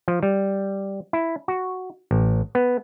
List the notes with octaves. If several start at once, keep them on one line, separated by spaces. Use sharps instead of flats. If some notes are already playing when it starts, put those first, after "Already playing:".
F3
G3
E4
F#4
A1
B3